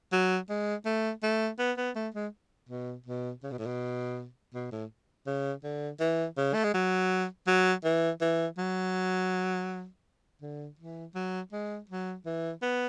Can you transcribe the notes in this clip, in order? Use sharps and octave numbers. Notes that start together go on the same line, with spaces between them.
F#3
G#3
A3
A3
B3
B3
A3
G#3
B2
B2
C#3
B2
A2
B2
B2
A2
C#3
D3
E3
C#3
A3
G#3
F#3
F#3
E3
E3
F#3
D3
E3
F#3
G#3
F#3
E3
B3